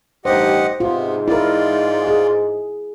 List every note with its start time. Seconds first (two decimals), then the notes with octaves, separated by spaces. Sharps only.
0.25 A1 G2 D#4 G4 C5 D#5 F#5
0.80 G#2 C3 B3 F4
1.28 E4 F4 A#4 D5
2.07 G#4